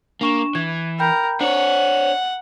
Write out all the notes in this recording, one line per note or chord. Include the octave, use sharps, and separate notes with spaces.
A#3 D4 C#6 E7
E3 G#6
A#4 G5 B5 G6
D4 C5 C#5 F#5